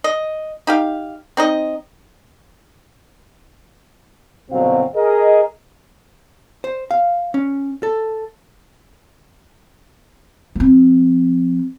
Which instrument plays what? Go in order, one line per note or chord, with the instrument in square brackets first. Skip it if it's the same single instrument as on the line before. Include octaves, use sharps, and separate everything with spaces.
[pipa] D#5
D#4 G4 F5
C4 D#4 D#5
[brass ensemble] G1 C2 B2 F#3 C4 F5
G#4 A#4 D#5
[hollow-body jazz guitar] C5
F5
C#4
A4
[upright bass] F3 C4